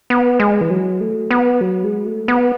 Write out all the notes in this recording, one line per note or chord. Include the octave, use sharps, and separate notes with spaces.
B3
G#3
E3
F#3
A3
B3
F#3
G#3
A3
B3